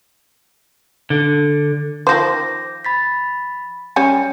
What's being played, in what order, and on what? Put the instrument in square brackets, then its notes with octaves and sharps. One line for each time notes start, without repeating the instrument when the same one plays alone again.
[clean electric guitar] D3
[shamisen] D#3 F3 C5 [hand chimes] D6 G6 A#6
[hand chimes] B5 A6 B6
[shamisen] G3 C#4 G#5 [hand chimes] C#7